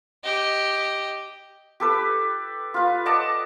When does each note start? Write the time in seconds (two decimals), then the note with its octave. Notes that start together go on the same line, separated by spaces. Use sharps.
0.24 G4 D#5
1.80 G4 A4 B4
2.74 F4 B4
3.06 D5 D#5 F#5 A5